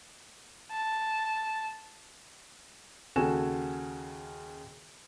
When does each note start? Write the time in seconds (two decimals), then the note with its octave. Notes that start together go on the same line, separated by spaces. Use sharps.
0.71 A5
3.16 D#2 C#3 F#4 A4 G#5 E7